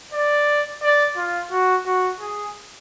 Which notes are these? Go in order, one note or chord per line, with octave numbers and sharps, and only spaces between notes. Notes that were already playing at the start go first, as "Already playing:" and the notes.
D5
D5
F4
F#4
F#4
G#4